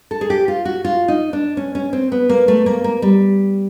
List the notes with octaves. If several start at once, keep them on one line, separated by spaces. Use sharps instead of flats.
A4
G#4
G4
F4
F#4
F4
D#4
D4
C#4
C#4
C4
B3
A#3
A3
A#3
A#3
G3